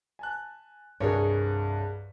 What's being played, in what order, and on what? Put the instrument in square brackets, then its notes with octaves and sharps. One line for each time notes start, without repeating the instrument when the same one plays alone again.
[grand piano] G#5 A5 F#6
[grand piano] C2 G2 [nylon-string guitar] G#4 A#4 C#5